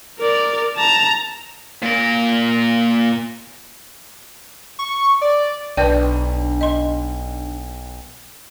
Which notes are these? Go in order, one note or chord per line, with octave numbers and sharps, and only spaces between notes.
A#4 D5
A5 A#5
A#2 A#4
C#6
D5
B1 D4 B4 D5 G5
D#5 C6